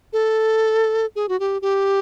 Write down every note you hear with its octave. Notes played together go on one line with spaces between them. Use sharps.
A4
G#4
F#4
G4
G4